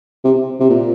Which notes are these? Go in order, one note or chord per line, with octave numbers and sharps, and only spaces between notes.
C3
C3
A#2